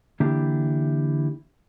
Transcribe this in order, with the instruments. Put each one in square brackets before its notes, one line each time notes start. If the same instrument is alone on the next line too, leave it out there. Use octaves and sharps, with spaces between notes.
[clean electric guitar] D3 E3 A#3 D4 E4 G4